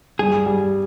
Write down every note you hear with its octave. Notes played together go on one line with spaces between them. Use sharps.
G2 G#4
G3